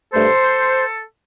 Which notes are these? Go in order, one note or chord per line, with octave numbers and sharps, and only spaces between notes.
G2 D3 A3 A4 C5